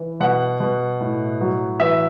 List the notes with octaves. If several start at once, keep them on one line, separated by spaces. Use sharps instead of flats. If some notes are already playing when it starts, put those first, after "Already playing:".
Already playing: E3
B2 F#5
B2
A2
F#3
E3 E5